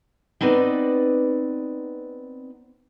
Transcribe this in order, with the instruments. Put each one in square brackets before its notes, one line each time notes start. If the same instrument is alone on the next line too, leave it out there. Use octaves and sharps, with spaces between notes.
[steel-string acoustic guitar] B3 C4 D#4 B4 D5